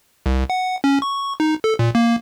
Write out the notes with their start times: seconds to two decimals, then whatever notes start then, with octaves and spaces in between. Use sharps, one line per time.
0.26 C2
0.50 F#5
0.84 C#4
1.02 C#6
1.40 D#4
1.64 A4
1.79 A#2
1.95 A#3